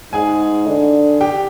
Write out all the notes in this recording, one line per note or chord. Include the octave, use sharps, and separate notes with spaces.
G#2 G#4 G#5
D3
G4 G5